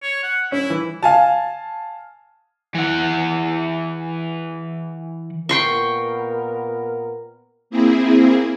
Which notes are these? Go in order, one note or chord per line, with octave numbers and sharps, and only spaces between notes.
C#5
F#5
C#4 E4
E3
F5 G#5 A5
E3 F#5
A#2 B3 A#4 G5 C6 C#6
A#3 C4 E4 G#4